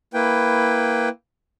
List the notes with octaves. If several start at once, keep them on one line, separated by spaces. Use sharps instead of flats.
A#3 E4 B4 G5